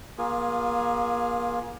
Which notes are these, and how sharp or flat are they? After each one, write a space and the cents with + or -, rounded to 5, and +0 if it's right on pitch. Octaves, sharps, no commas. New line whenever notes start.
A#3 +35 F4 +15 G#4 +0